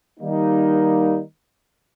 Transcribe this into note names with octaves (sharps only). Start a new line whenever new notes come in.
D#3 G3 A#3 D#4